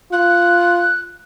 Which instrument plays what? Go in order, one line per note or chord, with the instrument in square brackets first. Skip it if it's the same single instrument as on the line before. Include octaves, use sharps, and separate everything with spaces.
[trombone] F4 [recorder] F#6